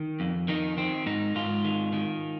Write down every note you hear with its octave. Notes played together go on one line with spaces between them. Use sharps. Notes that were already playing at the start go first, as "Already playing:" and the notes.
Already playing: D#3
F2
D#3 D#4
D#3 C4
G#2 D#4
G#2 F4
D#3
D#3